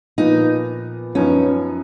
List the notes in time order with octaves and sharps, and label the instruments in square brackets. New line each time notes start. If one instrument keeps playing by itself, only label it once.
[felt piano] A#2 F3 B3 [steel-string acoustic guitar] D#4
[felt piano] F#2 F3 B3 D#4 [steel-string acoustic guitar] C#4